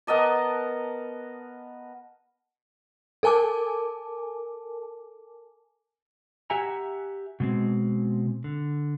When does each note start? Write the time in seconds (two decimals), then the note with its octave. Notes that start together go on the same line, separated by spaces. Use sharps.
0.07 B3 A#4 D#5 A5
3.23 A4 A#4 G#5 A5 D6
6.50 G4 E5 F#5 G#5 A#5
7.40 B2 G#3 C4
8.44 D3